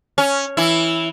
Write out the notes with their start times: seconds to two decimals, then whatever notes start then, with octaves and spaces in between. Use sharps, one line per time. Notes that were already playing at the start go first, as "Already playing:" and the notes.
0.18 C#4
0.57 E3 E4